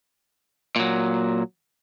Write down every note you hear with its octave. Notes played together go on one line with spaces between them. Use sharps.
A#2 F#3